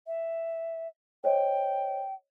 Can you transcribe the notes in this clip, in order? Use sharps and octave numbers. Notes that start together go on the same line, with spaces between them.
E5
C5 C#5 D#5 G5